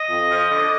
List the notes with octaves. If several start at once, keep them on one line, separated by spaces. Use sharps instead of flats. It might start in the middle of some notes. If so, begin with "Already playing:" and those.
Already playing: D#5
F2
F3
D3